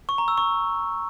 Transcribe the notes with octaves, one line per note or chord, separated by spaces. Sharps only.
C#6
A#5
E6
C#6